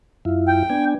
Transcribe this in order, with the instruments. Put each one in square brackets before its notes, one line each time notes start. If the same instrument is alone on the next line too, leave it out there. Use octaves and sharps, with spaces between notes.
[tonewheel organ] F#2 E4 F4
[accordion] G5
[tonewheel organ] B3 D4 G#5